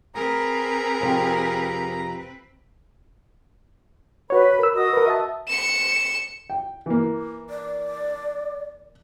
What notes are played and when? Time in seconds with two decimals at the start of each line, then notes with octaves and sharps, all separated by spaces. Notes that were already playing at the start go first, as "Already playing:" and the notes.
0.15 C4 G#4 A#4 B4 A#5
1.01 F2 C3 G5
4.30 F#4 B4 C#5 B5
4.59 A#4 E6
4.75 F#4 D#5 D#6
4.93 A#4 B4
5.07 E5 A5
5.48 C#7 E7
6.50 G5
6.86 E3 A#3
7.50 D5